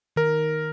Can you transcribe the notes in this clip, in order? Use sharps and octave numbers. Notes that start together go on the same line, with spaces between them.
D#3 A#4